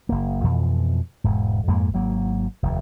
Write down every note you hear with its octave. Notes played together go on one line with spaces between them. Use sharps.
F#1 A#3
F2 B2 E3 F3
E1 G#2
F2 G#2 G#3 A#3
G#1 F#3 A#3
F1 D#2